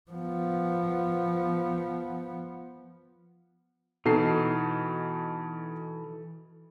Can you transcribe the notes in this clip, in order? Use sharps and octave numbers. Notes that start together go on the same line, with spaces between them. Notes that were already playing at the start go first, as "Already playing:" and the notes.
F3 B3
B2 E3 D#4 A4 C7